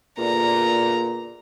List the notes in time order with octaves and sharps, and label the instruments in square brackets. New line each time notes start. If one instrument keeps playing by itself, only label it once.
[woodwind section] E2 D3 [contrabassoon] A#2 [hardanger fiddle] A#5